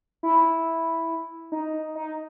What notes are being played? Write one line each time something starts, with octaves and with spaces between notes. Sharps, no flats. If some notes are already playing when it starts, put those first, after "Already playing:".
E4
D#4
D#4